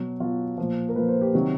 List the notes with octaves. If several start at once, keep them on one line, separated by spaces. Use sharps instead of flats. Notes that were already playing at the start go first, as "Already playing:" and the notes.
Already playing: B2 F#3
B2 F#3 F4
A#2 F3
A#4
A#2 F3 B4
C5
G4
C3 D#3 F#3 F#4